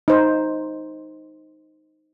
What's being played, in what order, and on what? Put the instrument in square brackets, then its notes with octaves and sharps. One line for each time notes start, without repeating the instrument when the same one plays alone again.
[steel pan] D#4 C5